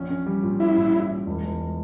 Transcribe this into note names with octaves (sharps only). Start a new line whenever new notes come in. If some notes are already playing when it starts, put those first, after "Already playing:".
Already playing: A#1 C#4
C#4
G3
A#2
C#4 E4
A#2
A#2
A#2
E1
E1